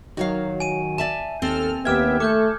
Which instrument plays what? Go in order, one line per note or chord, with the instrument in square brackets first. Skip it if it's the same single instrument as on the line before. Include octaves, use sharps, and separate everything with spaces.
[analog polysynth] D#3 F#3 [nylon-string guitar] F#4 C#5 F5
[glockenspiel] G#5 D#7
[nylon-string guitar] D5 E5 A5
[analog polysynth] D#2 A4 F6 [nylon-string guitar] C4
[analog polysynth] D#2 G4 E5 [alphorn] B3 [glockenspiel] D6 F6 G#6
[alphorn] A3 [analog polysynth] A4 [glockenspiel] D6 F#6 G6